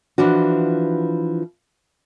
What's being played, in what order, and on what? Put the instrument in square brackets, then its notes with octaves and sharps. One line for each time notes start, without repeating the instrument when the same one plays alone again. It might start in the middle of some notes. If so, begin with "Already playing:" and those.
[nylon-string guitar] E3 F3 D4 F#4